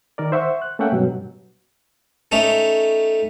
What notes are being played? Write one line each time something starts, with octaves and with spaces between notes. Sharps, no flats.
D#3 A#4 D5
C5 E5 F#5 C#6
F#6
A3 A#3 C#4 E5 F#5 G5
G2 B2 F#3
A3 C#4 D#4 A4